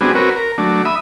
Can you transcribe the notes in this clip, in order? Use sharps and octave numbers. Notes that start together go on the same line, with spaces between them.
G3 B3 C4 D4 F#4 G#4
C4 F#4 A#4 B4 C#5
A#4
F#3 A3 D4
E5 B5 D#6